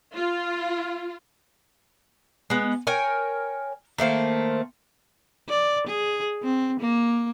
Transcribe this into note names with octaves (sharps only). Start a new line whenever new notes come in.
F4
G#3 B3
A#4 C#5 G5 G#5
D#3 A3 A#3 C5
D5
G#4
C4
A#3